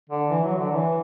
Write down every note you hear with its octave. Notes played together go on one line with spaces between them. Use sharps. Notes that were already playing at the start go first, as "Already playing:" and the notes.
D3
E3
F#3
D3
E3